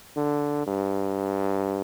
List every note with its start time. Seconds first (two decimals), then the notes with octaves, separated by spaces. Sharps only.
0.16 D3
0.67 G2